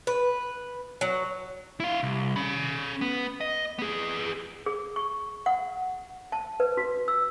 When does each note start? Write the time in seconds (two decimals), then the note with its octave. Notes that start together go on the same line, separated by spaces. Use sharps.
0.07 B4
1.01 F#3
1.80 E4 F5
2.03 C2
2.36 C#4 B5
3.01 B3
3.41 D#5
3.79 B3 G#4
4.66 G#4
4.96 C#6
5.46 F#5
6.32 A5
6.60 B4
6.77 F#4
7.08 E6